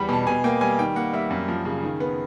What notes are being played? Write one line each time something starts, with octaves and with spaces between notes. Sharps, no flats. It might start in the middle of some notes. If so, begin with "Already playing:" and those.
Already playing: E2 G3 B5
B2 A5
B2 G#5
A#3 G5
G3 G#5
D#3 G5
A#3 F#5
G3 E5
F#2
F3
C#3
D#3
B3